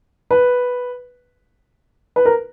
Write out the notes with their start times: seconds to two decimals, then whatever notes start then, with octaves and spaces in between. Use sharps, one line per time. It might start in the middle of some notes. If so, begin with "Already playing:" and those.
0.31 B4
2.16 B4
2.25 A#4